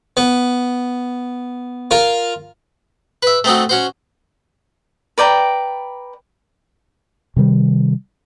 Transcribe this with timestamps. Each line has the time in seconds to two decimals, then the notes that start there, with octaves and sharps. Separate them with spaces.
0.17 B3
1.91 F4 A#4
3.23 B4 E5
3.44 A3 C4 D#4 F#4
3.69 C#4 F#4 C5
5.18 B4 D5 G5 A#5
7.36 C3 D#3 G3